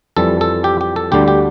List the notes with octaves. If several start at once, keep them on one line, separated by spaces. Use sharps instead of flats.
F2 E3 G3 A4
A4
G4
G4
A4
D2 D3 G3 G4
G4